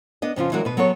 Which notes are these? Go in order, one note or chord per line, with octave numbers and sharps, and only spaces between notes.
B3 D4 D#5
F2 C#3 F3 F4
E3 F#3 G#3 D4 F#4 A#4
B2 B4
F#3 B3 G#4 A4 C#5